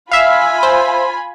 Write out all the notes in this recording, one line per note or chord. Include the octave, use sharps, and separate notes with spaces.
F4 E5 F5 G#5 B5
C5